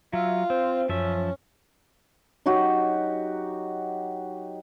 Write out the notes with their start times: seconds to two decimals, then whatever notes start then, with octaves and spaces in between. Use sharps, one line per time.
0.13 F#3 F4 E5
0.50 C4 C5
0.89 F#2 F3 C#4 E5
2.46 F#3 D#4 F#4 G4